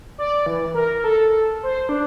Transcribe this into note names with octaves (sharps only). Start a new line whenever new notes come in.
D5
E3
A#4
A4
C5
D4